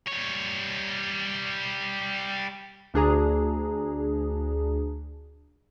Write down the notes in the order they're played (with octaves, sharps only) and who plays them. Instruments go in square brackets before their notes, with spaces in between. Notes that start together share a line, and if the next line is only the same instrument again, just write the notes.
[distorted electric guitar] G3 C#5
[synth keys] D2 D4 G#4 A#5